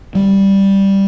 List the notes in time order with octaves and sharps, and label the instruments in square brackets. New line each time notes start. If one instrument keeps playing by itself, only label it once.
[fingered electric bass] G3